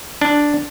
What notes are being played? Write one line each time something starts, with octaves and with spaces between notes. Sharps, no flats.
D4